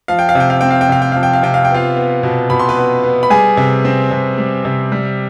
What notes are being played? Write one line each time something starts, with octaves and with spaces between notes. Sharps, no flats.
F3 F5
G5
F5
C3 G5
F5
C4 G5
F5
G5
C3 F5
G5
F3 F5
G5
F5
C3 G5
F5
G5
B3 F4 F5
B3
B2
B2 B5
C6
B4 B5
B3
B3
B5
G3 G#4 G#5
C3
C4
C3
G3
C3
G3